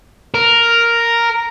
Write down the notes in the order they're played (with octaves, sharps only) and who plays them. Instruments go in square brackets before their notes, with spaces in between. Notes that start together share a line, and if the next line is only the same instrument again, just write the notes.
[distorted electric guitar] A#4